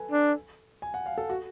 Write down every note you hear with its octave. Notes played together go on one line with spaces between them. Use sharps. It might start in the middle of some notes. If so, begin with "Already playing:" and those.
Already playing: A4 B4 G#5
D4
G#5
F#5
F5
A4
F#4